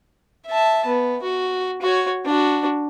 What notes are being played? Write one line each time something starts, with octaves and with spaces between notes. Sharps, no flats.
E5 A5
B3
F#4
F#4 C#5
D4 F#4